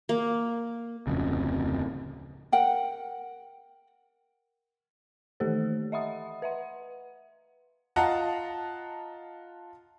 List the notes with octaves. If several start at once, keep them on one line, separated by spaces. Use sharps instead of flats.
A#3
D1 F2 C#3
A#4 F#5 G5
D#3 E3 A3 G4 A4 C5
D#5 E5 F#5 B5 D#6
B4 E5 F#5
F4 D#5 F#5 A5 A#5